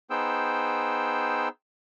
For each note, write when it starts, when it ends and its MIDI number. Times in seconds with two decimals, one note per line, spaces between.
0.10 1.48 59
0.10 1.48 63
0.10 1.48 68
0.10 1.48 72
0.10 1.48 79
0.10 1.48 88